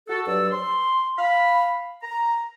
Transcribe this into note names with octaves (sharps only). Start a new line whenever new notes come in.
F#4 A4
G2 F#3 D5 E6
C6
F5 B5
A#5